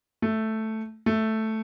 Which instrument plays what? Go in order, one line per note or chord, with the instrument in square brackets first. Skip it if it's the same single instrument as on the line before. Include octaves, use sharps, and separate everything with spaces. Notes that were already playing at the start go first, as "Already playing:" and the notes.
[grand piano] A3
A3